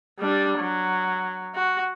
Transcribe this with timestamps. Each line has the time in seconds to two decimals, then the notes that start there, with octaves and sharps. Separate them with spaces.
0.19 G3 D4
0.59 F#3
1.55 F#4